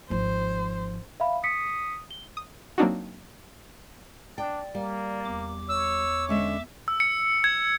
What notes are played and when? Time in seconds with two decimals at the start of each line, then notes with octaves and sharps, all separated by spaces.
0.10 G#1 F3 C5
1.20 E5 F5 B5
1.44 D#6 B6 C#7
2.11 G7
2.37 D#6
2.78 F#3 A#3 C4 D4 D#4 F#4
4.38 D4 D5 G5
4.75 G3 A#3
5.25 E2 D6
5.69 C#5 E6
6.29 D3 G#3 C#4 E5
6.88 E6
7.00 C#7
7.44 G#6